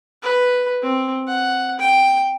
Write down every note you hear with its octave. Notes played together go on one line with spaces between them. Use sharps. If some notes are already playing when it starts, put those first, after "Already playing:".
B4
C4
F#5
G5